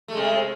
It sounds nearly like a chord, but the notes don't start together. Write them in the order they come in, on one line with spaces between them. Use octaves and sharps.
A3 G#3 C3